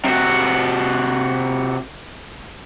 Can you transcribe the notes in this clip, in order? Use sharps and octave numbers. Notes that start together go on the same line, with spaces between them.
C3 F#4